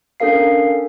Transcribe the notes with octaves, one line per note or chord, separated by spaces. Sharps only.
C#4 D4 A4 A#4 F5 C7